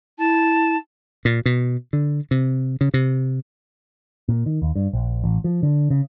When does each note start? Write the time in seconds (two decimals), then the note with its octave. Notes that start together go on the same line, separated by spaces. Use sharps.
0.19 E4 A5
1.25 A#2
1.46 B2
1.93 D3
2.31 C3
2.81 C#3
2.94 C3
4.29 A#2
4.46 D#3
4.62 D#2
4.76 G2
4.93 A#1
5.24 A1
5.44 F3
5.63 D3
5.90 C#3